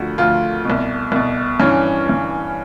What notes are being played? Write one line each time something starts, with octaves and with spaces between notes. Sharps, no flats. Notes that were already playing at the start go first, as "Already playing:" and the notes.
Already playing: D2 D3 F3 F#4
D2 D3 F3 F4
C2 B2
C2 B2
G2 E3 C#4
G2 E3